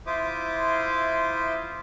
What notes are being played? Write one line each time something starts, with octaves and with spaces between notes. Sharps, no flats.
E4 F4 C5 E5 D6 D#6